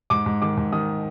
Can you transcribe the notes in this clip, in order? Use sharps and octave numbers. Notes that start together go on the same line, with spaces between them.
G#2 D6
G#2
D#3 D6
G#2
D#3 D#6